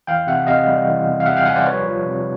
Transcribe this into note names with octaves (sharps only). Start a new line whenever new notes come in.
E3 F5 G5
C3 E5 F#5
C3 D#5 F5
G3
E3
C3
F5
C3 E5 F#5
F5 G5
G3 F#5 G#5
C5 D5
F3 B4 C#5
F3
C3